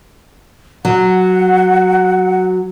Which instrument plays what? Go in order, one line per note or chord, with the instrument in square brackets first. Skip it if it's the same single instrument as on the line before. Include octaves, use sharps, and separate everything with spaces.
[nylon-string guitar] F#3 [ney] F#5